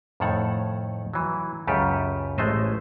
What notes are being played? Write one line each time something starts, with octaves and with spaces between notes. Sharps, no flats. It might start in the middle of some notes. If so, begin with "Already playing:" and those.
F2 A2 D#3 A4 C#5 F#5
E3 F#3
C#2 F#2 C#3 G4 A4 B4
A1 G#3 A3 C5 D#5